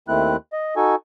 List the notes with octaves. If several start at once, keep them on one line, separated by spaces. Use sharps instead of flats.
D#2 D#3 A3 C4 E4 F#6
D#5
D#4 F#4 A4 G#5